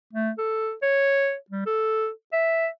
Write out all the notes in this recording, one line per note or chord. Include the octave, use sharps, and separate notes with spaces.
A3
A4
C#5
G3
A4
E5